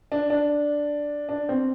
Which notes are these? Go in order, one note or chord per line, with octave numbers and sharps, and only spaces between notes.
D4
D4
D4
C4